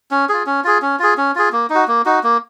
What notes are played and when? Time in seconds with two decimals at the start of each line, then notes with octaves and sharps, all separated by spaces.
0.11 C#4
0.29 F4 G#4
0.46 C#4
0.64 F4 G#4
0.82 C#4
0.99 F4 G#4
1.17 C#4
1.35 F4 G#4
1.52 A#3
1.70 D#4
1.75 F#4
1.88 A#3
2.06 D#4 F#4
2.23 A#3